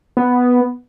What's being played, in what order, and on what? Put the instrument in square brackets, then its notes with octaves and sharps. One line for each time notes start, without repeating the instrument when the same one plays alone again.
[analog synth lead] B3